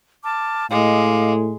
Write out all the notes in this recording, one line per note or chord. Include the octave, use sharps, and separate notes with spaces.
A5 D6 F6
A2 G#3 D#5 F5 D6